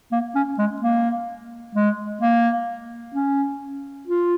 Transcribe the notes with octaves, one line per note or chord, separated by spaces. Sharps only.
A#3
C#4
G#3
A#3
G#3
A#3
C#4
F4